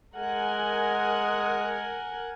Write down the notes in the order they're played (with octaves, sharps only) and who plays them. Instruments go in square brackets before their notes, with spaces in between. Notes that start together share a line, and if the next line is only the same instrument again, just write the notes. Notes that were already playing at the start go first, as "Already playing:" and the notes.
[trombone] G#3 [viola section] A#4 F#5 G#5